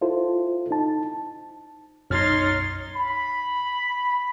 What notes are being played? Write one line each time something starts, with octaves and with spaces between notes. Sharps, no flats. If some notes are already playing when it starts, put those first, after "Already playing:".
E4 F4 A4 C5
D#4 A5
B1 F#2 D#4 C#5 C6 F6 A6
B5